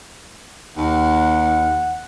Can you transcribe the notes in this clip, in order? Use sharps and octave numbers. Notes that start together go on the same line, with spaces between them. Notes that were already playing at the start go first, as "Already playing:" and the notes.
D#2 F#5